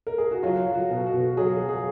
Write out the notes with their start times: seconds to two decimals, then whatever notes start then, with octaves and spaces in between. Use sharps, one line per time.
0.07 A#4
0.18 G#4
0.31 F#4
0.43 F#3 F4
0.66 F#3
0.74 F#4
0.91 B2
1.06 F#4
1.14 B2
1.37 F#3 G#4
1.62 F#3
1.69 G#4